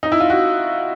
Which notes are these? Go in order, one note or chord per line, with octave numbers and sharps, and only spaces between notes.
D#4
E4
F4
F#4